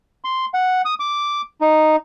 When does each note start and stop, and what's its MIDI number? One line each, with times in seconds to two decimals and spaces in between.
0.24 0.46 84
0.54 0.82 78
0.85 0.94 87
1.00 1.41 86
1.61 1.96 63